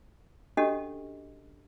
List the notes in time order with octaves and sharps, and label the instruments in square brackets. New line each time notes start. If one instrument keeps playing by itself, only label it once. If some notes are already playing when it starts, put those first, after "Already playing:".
[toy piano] C#4 D4 F#4 G4 A4 D#5